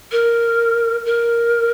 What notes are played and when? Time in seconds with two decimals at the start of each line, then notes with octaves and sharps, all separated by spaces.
0.12 A#4
1.05 A#4